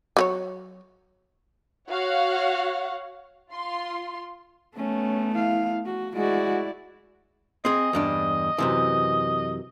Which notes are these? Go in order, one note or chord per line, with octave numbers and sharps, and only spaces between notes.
F#3 F#4 C#5
F#4 C#5 F5 F#5
F4 C6
A3 B3 C#4
E4 F5
F#4
G#3 E4 F#4 D5
C4 G#4 D#5
E2 G2 D4
F#2 C3 E3